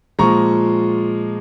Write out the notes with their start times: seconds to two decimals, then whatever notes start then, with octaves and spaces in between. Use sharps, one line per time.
0.19 A#2 F3 G#3 A#5 C#6